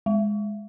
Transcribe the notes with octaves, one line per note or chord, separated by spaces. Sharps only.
G#3